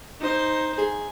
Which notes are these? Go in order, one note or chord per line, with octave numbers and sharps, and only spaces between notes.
D#4 C5
G#4